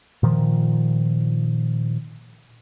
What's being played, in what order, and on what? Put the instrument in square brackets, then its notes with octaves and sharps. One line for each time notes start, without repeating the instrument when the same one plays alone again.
[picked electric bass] A#2 D#3 F3